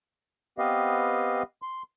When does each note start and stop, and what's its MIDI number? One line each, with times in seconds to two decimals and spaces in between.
0.58 1.43 59
0.58 1.43 60
0.58 1.43 67
0.58 1.43 71
0.58 1.43 75
0.58 1.43 77
1.62 1.83 84